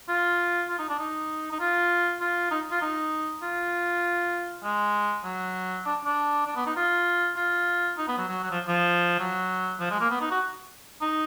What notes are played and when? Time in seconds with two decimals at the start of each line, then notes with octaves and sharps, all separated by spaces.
0.08 F4
0.69 F4
0.79 D#4
0.89 D4
0.99 D#4
1.52 D#4
1.60 F4
2.20 F4
2.51 D#4
2.71 F4
2.82 D#4
3.42 F4
4.64 G#3
5.24 F#3
5.85 D4
6.05 D4
6.46 D4
6.56 B3
6.66 D#4
6.76 F4
7.37 F4
7.98 D#4
8.08 B3
8.18 F#3
8.28 F#3
8.43 F#3
8.51 F3
8.68 F3
9.19 F#3
9.80 F3
9.90 G#3
10.01 A#3
10.10 B3
10.21 D#4
10.30 F#4
11.01 D#4